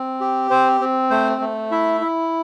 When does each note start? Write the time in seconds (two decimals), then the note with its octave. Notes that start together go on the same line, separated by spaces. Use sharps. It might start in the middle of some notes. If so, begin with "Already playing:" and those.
Already playing: C4
0.21 G4
0.50 C4 C5
0.81 C4
1.10 A3 C5
1.41 A3
1.71 E4 E5
2.01 E4